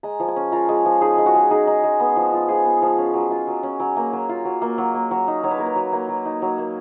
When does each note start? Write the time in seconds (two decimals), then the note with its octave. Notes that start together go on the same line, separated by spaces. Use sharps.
0.03 G#3 A#5
0.20 F3
0.28 G#5
0.36 C#4
0.52 F4 A#4
0.69 G#3
0.85 F3
1.01 D#4 G#4
1.18 G#3
1.26 F#4
1.34 G#3
1.51 D#4 G#4
1.67 D#4
1.84 G#3
2.00 B3
2.16 F3
2.33 F4
2.48 F3 G#4
2.65 B3
2.82 F3
2.98 C#4
3.14 F#3
3.31 F4
3.47 F#3
3.63 C#4
3.80 F#3
3.97 A#3
4.13 F#3
4.29 F4
4.45 F#3
4.62 A#3
4.78 F#3
4.94 A#3
5.11 F#3
5.28 D#4
5.43 F#3 C#5
5.51 B4
5.58 A#3 A#4
5.66 B4
5.76 F#3
5.93 A#3
6.09 F#3
6.25 D#4
6.41 F#3 C#5
6.58 A#3